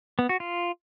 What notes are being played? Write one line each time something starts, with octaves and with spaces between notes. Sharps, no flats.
B3
F#4
F4